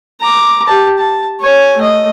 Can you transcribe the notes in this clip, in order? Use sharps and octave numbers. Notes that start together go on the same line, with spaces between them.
A#5 D6
G4 A5
A5
C#5 G#5
A3 D#5